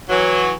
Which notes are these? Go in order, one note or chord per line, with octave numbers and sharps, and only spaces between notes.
E3 F#3